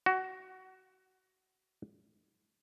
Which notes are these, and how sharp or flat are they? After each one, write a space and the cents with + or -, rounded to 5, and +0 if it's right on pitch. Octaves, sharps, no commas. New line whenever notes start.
F#4 +20